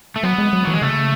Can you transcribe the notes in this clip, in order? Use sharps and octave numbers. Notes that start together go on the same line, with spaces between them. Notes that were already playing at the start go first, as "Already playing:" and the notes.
A3
F#3 B3
G#3
F#3
E3 F#3
G#3
C#3 A3